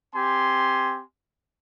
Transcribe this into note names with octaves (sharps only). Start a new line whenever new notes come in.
C4 G4 G#5 C6